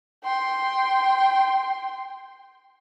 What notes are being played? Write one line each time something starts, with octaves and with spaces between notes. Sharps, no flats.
G5 C6